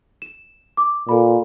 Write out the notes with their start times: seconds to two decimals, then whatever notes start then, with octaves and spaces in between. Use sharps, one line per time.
0.22 E7
0.77 D6
1.09 A#2 A4 B5